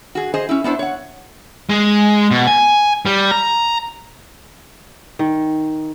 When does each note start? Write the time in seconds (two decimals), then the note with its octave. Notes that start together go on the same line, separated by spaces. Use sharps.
0.15 F#4 G#4
0.34 G#4 C5 D#5
0.49 C#4 E4
0.64 B3 D4 E4 C5
0.79 C#5 F#5
1.70 G#3
2.31 B2
2.47 G#5
3.06 G3
3.31 A#5
5.19 D#3